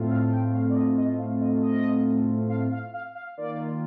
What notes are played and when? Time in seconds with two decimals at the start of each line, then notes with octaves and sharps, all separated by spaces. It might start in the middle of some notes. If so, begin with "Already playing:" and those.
Already playing: A2 A3 C4 F4
0.10 F5
0.32 G5
0.54 F5
0.70 D5
0.75 D#5
0.97 D#5
1.19 F5
1.41 D#5
1.62 D#5
2.49 F5
2.72 F5
2.93 F5
3.15 F5
3.37 D#3 A#3 F4 D5